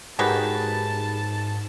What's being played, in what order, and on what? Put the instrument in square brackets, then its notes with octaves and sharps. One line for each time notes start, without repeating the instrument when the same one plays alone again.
[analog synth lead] G#2 [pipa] D#3 F#3 B4 [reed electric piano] G4 G#4 [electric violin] A5